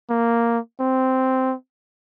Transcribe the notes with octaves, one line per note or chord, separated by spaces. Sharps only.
A#3
C4